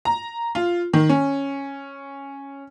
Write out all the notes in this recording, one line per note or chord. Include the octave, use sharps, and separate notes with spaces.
A#5
F4
D#3
C#4